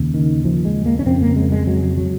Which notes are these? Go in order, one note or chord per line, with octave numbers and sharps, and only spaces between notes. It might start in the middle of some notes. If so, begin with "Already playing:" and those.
Already playing: D#2 C#3
D#3
F3
G#3
A#3
C#4
F2 C#3 C4
A#3
G#3
G#3
F#3
F#3